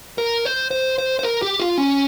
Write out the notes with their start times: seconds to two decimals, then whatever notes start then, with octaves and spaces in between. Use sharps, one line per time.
0.18 A#4
0.45 C5
0.71 C5
0.98 C5
1.19 C5
1.24 A#4
1.42 G4
1.60 F4
1.78 C#4